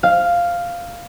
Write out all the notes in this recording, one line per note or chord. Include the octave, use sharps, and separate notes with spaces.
F5